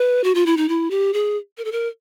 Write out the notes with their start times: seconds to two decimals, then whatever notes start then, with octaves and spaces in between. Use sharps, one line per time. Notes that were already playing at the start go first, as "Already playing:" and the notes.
Already playing: B4
0.24 F#4
0.35 F4
0.46 E4
0.57 D#4
0.69 E4
0.91 G4
1.13 G#4
1.58 A#4
1.65 A4
1.72 A#4